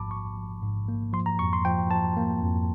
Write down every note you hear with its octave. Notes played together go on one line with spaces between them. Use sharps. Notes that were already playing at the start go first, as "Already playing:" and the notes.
Already playing: A1 G#2 F3 A#3 A5 B5 D6
G#2 C#6
F3
G#2
A#3
F3 C6
A#5
F2 C#6
C6
F3 G5
F3 A5
A#3
F2